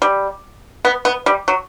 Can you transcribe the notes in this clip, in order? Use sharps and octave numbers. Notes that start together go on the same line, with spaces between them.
G3
B3
B3
G3
F#3